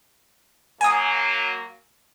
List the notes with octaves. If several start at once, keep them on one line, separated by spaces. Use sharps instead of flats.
F#3 A#3 G#5 D#6